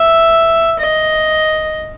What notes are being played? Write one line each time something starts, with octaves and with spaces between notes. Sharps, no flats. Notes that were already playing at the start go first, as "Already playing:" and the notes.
Already playing: E5
D#5